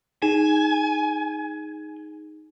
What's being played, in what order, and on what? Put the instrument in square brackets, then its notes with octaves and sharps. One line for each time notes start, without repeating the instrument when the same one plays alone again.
[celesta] D#4 G#4 E7 [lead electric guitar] G#5